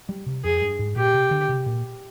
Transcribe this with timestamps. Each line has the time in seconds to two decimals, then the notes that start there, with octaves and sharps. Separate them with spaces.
0.09 G3
0.26 C3
0.44 F2 G#4
0.61 G2
0.79 G#2
0.96 A#2 G4
1.14 C3
1.31 D3
1.49 C3
1.66 A#2